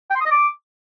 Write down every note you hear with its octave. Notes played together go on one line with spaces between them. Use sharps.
G5
C6
D#6
D#5
D6